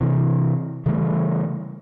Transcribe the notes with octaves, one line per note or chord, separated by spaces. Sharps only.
C3 E3
C#3 E3 G3 A3